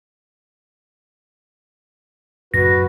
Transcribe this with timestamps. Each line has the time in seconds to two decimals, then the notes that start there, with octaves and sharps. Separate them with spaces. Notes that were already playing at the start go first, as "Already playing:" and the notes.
2.54 F#2 A2 C#3 F#4 B4 A#6